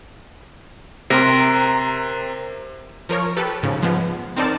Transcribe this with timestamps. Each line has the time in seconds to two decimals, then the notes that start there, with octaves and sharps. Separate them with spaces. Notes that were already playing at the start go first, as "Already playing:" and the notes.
1.10 C3 A#4 C6
3.09 F3 A#4 C#5
3.37 G4 A4 B4
3.63 G#2 C#3 F3
3.82 F3 G#3 B3
4.36 C4 D#4 A#4 C5 D5 A5